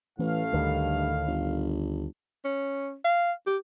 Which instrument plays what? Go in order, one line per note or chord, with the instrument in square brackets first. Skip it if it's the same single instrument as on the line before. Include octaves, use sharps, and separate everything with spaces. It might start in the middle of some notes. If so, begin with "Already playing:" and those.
[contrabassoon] A1 [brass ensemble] A2 F5 [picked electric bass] E3
[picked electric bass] D2 D3 D#3 [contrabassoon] G2
[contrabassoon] G1
[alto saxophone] C#4
F5
G4